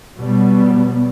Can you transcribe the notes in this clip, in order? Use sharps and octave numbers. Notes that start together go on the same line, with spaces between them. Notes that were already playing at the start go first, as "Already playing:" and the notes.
B2 F#3 G3 B3